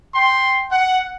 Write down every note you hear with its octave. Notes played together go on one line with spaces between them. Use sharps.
G5 C6
F#5